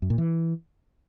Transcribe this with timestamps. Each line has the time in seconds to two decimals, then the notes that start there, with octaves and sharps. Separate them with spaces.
0.02 F#2
0.10 A#2
0.18 E3